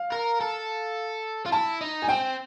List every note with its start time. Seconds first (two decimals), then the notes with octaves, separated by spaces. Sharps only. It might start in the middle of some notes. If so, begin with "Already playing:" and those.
Already playing: F5
0.12 A#4
0.41 A4
1.46 F4
1.52 E4 A5
1.81 D#4
2.02 G#5
2.08 C4 G5